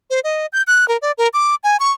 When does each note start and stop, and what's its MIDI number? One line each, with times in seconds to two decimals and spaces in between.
0.10 0.20 72
0.24 0.46 75
0.53 0.62 91
0.67 0.88 90
0.88 0.97 70
1.02 1.12 74
1.18 1.28 70
1.33 1.55 86
1.64 1.77 80
1.80 1.92 85